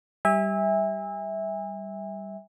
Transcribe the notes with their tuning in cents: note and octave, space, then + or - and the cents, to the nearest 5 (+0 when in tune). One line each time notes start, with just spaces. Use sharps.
G3 +0 E5 -15 G#5 -35